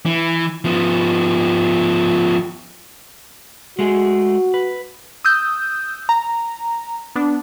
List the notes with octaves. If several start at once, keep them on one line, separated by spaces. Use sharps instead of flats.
E3
F3 B3
G#3 A3 F#4 G#4
B4
D#6 E6 G6
A#5
B3 D4